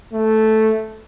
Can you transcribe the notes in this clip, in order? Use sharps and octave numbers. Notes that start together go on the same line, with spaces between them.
A3